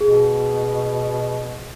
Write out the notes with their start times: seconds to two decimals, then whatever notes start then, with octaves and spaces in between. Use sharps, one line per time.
0.01 B2 G#4